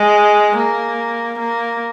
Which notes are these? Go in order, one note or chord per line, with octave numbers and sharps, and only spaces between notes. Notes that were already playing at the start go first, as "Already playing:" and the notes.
Already playing: G#3
A#3
A#3